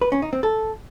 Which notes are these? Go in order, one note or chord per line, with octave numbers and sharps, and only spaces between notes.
B4
C#4
D#4
C4
A4